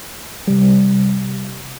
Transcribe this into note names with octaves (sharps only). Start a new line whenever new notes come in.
C3 G3